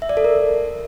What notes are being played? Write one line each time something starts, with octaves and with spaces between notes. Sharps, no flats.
E5
D5
A4
A#4